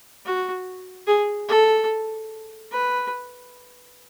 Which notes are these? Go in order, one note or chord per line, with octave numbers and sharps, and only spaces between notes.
F#4
G#4
A4
B4